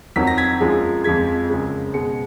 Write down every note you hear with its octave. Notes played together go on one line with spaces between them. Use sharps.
F2 D#3 F#3 B6
A#6
G#6 B6
F#2 F3 G#3
F2 F3 G#3 G#6 B6
F#2 C#3 G#3
B2 G#3 C#7